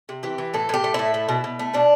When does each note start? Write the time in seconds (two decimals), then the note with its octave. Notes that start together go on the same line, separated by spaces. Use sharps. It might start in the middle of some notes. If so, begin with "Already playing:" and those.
0.09 C3
0.23 E3 G4
0.38 E3
0.54 A2 A4
0.69 A2 G4
0.84 A3
0.94 A2 E4
1.14 A3
1.29 B2
1.44 B2
1.59 A3
1.74 B2 D4